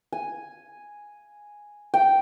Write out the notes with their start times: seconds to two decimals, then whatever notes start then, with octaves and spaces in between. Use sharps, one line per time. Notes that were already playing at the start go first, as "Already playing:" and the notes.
0.13 G#5
1.94 G5